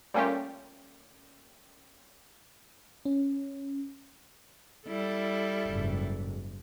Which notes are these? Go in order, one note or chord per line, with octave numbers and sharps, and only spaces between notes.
G3 A3 A#3 C#4 F4 G4
C#4
G3 E4 A4
F#1 G#2